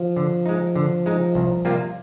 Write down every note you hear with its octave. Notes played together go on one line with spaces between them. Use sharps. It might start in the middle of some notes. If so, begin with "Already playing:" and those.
Already playing: F3
D3
G#3 D#4
D3
G#3 D#4
C2
C3 G3 A#3 F4